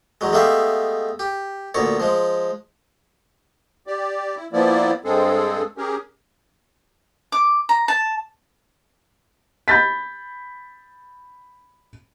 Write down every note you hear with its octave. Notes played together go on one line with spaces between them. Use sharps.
E2 F#3 G#3
G#3 A3 B3 G4 E5 F5
G4
D2 A#2 B3 C#5
F3 G#3
G4 D5
E4
F3 A#3 B3 E4 D5
G2 G#3 C4 G#4 A4
C#4 G4 G#4 A#4
D6
A#5
A5
B5 G6 A6 B6